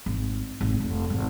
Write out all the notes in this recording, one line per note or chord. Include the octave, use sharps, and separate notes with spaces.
G#1
G#1
F1
G#1